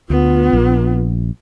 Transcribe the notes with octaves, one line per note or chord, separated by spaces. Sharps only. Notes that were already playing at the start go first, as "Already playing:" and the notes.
D2 B3 F4
A#1